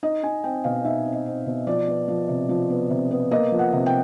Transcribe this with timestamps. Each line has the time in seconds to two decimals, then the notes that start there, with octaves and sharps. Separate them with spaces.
0.03 D#4 D#5
0.23 D#4 G#5
0.44 C4 G5
0.64 B2 F5
0.85 D#4 E5
1.05 C4
1.12 D#5
1.26 C4
1.46 B2
1.67 F3 D5
1.88 B3
2.08 F3
2.29 C3
2.49 F3
2.70 B3
2.90 C3
3.11 B3
3.31 A#3 D#5
3.52 F3
3.59 F#5
3.73 C3
3.86 G5